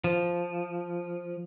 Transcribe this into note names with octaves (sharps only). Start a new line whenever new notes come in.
F3